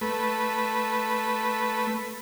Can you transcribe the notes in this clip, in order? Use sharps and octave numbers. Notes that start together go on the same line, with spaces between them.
A3 B4